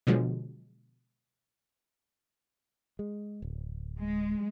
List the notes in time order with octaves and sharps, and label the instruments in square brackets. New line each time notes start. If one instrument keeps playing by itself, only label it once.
[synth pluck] B2 D3 F3 F#3 G#3
[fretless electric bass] G#3
D1
[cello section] G#3